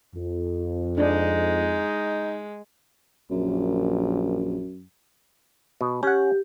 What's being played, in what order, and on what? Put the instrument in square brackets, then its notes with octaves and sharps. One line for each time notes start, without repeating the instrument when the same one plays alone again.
[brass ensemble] F2
[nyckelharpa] G#3 [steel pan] D4 [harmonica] D#4
[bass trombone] A#1 [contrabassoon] F#2
[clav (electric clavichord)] B2
[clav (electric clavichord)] C#4 F#5 [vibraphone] G4